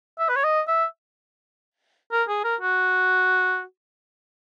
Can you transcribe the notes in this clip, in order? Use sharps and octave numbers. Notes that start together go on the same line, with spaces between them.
E5
B4
C#5
D#5
E5
A#4
G#4
A#4
F#4